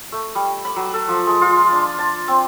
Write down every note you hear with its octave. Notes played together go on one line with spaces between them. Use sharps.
A3
G3
B5
F#3
A4
F3
G#3
F4
D4
A5
C4